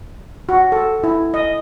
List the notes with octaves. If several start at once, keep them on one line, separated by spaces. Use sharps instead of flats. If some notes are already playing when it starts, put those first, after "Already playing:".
F#4
A4
E4
D#5